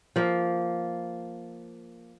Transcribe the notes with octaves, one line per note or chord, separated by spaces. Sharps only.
F3 A#3